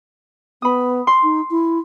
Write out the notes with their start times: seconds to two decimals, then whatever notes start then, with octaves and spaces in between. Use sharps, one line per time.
0.62 B3 B5 D#6
1.07 C6
1.23 D#4
1.51 E4